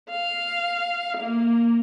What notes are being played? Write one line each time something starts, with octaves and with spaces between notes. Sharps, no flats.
F5
A#3